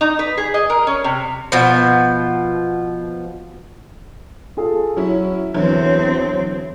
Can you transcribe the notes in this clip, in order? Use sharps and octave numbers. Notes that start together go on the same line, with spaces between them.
D#4
B4
G#4
D#5
A#4
C#4
C3
B2 F3
F4 G#4 A4
F#3 C#4 E4
E2 D3 E3 F#3 C4